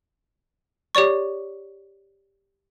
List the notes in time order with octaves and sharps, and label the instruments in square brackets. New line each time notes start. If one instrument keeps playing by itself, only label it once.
[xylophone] G4 C#5 D5 C#6